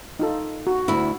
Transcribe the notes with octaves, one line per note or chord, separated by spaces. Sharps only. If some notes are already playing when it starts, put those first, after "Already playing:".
D#4 F4 A4
F#4
D2 E4